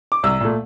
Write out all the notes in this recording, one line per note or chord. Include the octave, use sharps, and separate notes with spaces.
D6
C2 E6
A#2 A3